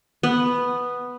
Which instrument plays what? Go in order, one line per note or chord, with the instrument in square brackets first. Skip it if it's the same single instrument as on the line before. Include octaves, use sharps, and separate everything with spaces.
[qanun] B3